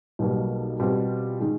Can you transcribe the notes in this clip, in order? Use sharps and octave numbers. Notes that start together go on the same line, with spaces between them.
B1 B2 G3 A#3
B2 G3 C4 F4
D#3 G#3